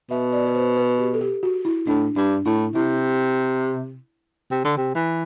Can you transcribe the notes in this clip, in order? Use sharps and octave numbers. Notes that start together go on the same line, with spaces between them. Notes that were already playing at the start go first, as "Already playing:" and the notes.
B2 E5
D5
B4
C5
B4
G4
A4
G4
F#4
E4
A2 D4
G2 D4
A2 E4
C3 E4
C3
D3
C3
E3